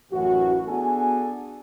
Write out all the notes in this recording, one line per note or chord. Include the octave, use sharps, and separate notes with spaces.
A1 F#2 A2 E3 F#4
B3 D4 F#4 G#4 A4 G#5